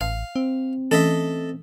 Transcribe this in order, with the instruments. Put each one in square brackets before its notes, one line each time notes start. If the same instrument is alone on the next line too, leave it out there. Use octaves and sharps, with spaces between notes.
[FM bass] A1 [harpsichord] F5
[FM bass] C4
[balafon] E3 A3 C#4 [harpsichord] A4 D#5 E5